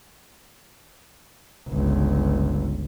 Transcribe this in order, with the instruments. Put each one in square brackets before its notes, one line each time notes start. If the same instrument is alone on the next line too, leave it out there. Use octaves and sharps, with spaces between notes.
[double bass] G1 C#2